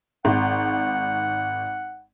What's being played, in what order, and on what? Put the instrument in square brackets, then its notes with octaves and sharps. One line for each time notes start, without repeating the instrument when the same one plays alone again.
[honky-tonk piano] G#1 [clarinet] F#5